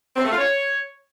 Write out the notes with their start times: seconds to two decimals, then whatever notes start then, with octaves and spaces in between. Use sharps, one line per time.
0.16 C4
0.24 A3
0.31 F4
0.38 C#5